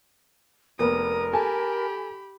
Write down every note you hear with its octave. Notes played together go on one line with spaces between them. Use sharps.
F1 A#3 B3 A#4 D#6
G4 A4 G#5 A5 B5